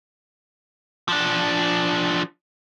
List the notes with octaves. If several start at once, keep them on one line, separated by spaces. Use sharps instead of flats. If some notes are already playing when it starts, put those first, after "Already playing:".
F3 D4